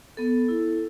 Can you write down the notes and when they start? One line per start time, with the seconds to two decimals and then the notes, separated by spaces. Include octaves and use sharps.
0.17 B3 A4
0.48 E4